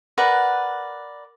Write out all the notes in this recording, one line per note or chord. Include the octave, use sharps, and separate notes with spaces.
A#4 B4 D5 F#5